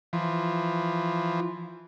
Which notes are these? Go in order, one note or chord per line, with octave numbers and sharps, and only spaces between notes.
E3 F3